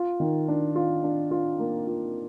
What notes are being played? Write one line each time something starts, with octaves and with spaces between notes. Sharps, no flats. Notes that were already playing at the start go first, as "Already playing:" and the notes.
Already playing: F4
D#3
D4
F4
D4
F4
A#3
F4